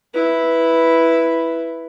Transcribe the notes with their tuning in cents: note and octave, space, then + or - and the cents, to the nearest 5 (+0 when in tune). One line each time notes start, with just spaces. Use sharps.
E4 +0 B4 +0